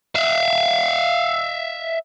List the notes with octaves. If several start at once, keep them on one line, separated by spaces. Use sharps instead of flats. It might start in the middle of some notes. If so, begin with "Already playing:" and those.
E5 F5